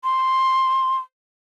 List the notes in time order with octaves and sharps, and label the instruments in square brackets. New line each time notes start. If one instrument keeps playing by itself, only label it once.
[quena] C6